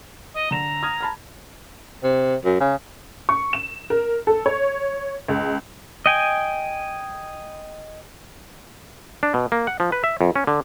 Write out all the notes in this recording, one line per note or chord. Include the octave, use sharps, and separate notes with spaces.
D#5
D3 A#5 E7
D#6 F6 G#6
A5 B5 F6
C3
F#2
C#3
C#6
E7
A#4
A4
C#5
C#2
D#5 G5 G#5
D4
B2
A#3
F#5
F3
B4
E5
F2
C#4
D3